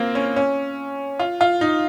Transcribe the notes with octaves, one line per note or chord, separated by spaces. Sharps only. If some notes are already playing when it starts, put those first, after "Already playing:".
Already playing: A#3 C4 F4
C#4
C#4
F4
F4
D#4